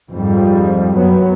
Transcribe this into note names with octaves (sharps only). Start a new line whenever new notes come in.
F2 G#2 F3 G3
F#2 F#3 B3